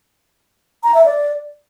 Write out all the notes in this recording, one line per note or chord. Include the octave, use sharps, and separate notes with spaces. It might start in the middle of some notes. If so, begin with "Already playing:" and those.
A#5
E5
D5